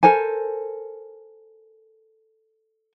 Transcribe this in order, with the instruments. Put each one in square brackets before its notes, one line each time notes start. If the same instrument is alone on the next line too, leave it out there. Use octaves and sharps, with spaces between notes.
[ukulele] A4 A#4 C5 G#5